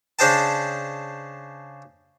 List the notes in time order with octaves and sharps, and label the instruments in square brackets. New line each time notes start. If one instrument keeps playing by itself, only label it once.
[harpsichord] C#3 D4 C5 D#5 G5 A5